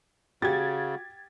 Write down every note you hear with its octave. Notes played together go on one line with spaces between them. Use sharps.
C#3 F#4 G4 G#6 A6